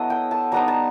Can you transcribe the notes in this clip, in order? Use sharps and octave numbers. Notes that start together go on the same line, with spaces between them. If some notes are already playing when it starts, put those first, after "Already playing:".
Already playing: F#3 B3 E4 A4 D#5
G5
A5
G3 B3 D#4 A#5
A5